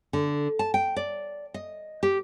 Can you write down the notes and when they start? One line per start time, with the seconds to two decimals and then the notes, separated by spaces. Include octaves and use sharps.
0.13 D3
0.59 A5
0.74 G5
0.96 D5
1.54 D#5
2.03 G4